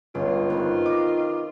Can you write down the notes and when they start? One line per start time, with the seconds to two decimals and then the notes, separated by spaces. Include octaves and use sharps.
0.15 G1 C#2 C#4 F4
0.50 D#3 C4 B4
0.86 D#5 D6